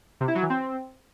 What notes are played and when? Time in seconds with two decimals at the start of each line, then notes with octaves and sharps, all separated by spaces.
0.20 C3
0.28 E4
0.35 F#3
0.42 E3
0.50 C4